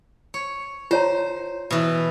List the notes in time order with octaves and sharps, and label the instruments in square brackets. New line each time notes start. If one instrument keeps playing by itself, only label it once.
[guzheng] C#5
[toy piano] F4 C#5 A#5 [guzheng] C5
[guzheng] B2 E3